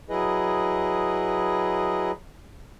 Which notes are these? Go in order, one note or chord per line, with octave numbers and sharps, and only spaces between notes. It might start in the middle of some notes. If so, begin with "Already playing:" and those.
F#3 E4 G#4 B4 D#5